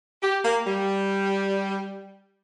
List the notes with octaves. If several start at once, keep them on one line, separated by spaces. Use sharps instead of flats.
G4
A#3
G3